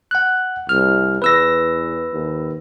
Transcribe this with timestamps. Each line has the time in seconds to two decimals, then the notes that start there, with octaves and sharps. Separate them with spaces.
0.11 F#5 F#6
0.69 C2 F6
1.22 E2 B4 E6 A#6
2.12 D#2